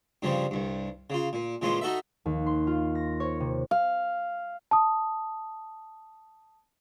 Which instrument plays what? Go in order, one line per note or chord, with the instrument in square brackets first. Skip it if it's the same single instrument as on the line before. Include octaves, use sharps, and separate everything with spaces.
[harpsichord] G2 C#3 F3 G3
C2 G2
C#3 F4
A#2
A#2 E3 G#3 C#4 F4
D#4 F#4 A4 E5
[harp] D#2
C6
F4
A#6
C#5
C3
[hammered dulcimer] F5
[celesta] A5 D#6